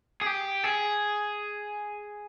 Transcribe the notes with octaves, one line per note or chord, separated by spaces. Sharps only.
G#4
G4
G#4